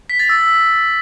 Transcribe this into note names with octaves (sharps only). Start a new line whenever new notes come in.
B6
A6
E6